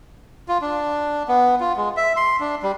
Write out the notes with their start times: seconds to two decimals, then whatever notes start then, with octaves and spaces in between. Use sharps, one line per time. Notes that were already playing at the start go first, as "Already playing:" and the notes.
0.48 F4
0.62 D4
1.28 B3
1.60 F4
1.76 G#3
1.97 E5
2.16 C6
2.40 D4
2.63 G3